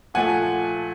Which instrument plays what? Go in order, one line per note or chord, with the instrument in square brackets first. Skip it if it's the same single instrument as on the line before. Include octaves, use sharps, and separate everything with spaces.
[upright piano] A#2 F3 A3 F#5 G#5